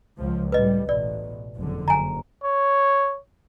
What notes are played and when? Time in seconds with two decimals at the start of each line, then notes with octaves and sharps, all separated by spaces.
0.19 C#2 F3
0.52 A2 G3 B4 D#5
0.89 A1 B2 D5
1.56 F#1 F2 D3
1.88 F#1 G#5 A#5
2.44 C#5